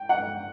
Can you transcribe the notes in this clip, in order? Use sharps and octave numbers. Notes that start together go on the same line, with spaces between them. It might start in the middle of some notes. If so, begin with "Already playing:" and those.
Already playing: G5
F#5